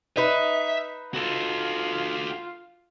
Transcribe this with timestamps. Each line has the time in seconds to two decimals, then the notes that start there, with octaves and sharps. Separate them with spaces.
0.17 D#4 B4 E5
1.14 F4 F#4 A4